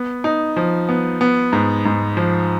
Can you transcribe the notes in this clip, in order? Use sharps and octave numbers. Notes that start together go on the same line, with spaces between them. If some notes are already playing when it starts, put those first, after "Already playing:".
Already playing: B3
D#4
F3
B3
B3
G#2
G#2
F3